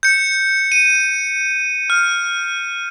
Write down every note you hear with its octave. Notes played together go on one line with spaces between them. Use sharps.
G6 C#7
D#7
F6